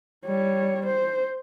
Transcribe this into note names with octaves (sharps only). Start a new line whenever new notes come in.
G3 C#5
C5